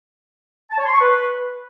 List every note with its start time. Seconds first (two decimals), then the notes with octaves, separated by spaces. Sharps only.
0.71 A5
0.78 C#5
0.85 C6
0.93 C#6
1.00 B4